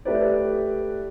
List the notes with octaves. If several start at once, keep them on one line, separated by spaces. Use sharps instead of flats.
A3 E4 G4 B4 D5